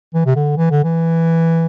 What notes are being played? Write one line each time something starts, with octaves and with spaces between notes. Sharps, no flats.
E3
C3
D3
E3
D3
E3